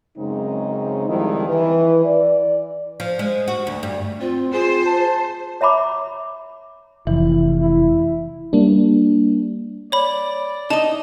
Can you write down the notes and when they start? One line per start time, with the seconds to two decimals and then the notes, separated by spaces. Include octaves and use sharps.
0.17 F#2 C#3 G#3 C4 D#4
1.09 F2 D#3 F3 G3 G#3 E4
1.48 E3 B4
2.05 D5
3.00 F3
3.19 G#3
3.48 F#4
3.67 D2
3.83 G2
4.21 C4 F4
4.53 F4 G#4 C5
4.86 A5
5.61 C#5 E5 A#5 B5 D6
7.07 F1 E3 E4
7.61 E4
8.53 G3 A#3 D4
9.92 C#5 D5 B5
10.70 D#4 D#5 A5